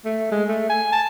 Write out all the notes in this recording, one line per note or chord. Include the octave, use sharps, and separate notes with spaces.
A3
G#3
A3
G#5
A5